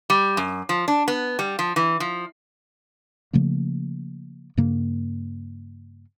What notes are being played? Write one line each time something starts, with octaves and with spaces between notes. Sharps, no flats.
G3
F#2
F3
D4
B3
G3
F3
E3
F3
C#3 F3 A3 A#3
G2 C#3 A#3